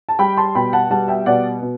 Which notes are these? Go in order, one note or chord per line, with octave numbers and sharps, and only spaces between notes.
A5
G3 G5 B5
A5 C6
B2 G5 B5
F#5 A5
G3 F#5 A5
E5 G5
B2 D5 F#5
B2